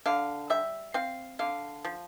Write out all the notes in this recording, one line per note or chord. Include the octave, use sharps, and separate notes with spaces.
D3 F5
G3 E5
C4 F5
D3 F5
F3